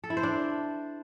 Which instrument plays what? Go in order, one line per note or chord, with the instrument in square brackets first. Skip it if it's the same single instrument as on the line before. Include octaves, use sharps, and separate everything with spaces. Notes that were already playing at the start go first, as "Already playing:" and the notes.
[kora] A4
E4
C5
D4